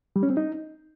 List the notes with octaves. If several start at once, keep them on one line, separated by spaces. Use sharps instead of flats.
G3
C#4
C4
D#4